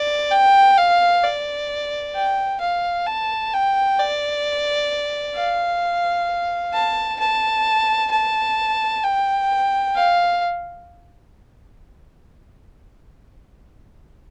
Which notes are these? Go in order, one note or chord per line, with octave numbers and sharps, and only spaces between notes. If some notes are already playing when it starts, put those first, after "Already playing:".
Already playing: D5
G5
F5
D5
G5
F5
A5
G5
D5
F5
A5
A5
A5
G5
F5